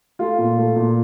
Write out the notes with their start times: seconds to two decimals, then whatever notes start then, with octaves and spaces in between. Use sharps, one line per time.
0.19 A3 F4
0.38 A#2
0.58 A3
0.76 A#2